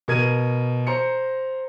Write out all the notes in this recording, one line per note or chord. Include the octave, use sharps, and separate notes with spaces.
B2 A#4 G#6 D#7
C5 A#5 C#7